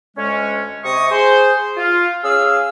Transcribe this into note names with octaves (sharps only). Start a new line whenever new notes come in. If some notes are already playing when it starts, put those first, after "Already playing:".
D2 G#3 C#4
C3 D#5 C#6 D#6
G#4 C5
F4
C#4 G#4 F5 E6